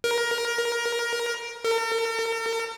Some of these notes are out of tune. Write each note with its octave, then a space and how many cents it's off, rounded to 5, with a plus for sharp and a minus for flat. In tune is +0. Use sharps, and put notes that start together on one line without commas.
A#4 +20
A#4 -45